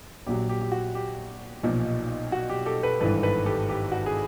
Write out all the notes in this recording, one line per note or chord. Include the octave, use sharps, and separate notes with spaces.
A#1 A#2 F#3 G4
G4
G4
F#4
G4
B1 A#2 F3
F#4
G4
G4 A4
A4 B4
G#1 G2 E3 A4 B4
A4 B4
G4 A4
G4
F#4
G#4